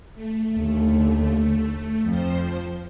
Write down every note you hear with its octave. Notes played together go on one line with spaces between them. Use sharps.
A3
D#2 D3
F2 F3 C5